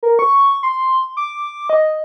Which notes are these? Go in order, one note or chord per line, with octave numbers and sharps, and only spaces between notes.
A#4
C#6
C6
D6
D#5